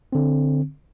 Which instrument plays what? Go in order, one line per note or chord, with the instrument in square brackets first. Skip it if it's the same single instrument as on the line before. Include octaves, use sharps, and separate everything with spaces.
[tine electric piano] D3 C4